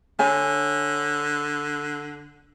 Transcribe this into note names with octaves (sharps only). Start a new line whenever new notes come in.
D3 C#5 G#5